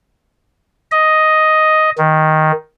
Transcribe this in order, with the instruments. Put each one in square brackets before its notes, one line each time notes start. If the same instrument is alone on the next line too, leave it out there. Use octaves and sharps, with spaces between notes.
[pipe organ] D#5
D#3